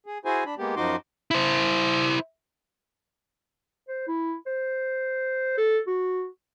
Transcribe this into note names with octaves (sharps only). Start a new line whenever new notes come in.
G#4
E4 F#4 G#4 C5 G#5
D4 B5
G#3 A#3 B3 G4
F#2 F3 D#4 F#4 C6 D6
E4 C5
C5
E4
C5
A4
F#4